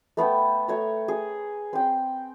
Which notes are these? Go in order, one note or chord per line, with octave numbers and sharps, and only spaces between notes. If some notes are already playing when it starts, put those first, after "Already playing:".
A3 B3 A4 G5
A3 C#5 A#5
G#4
C4 G5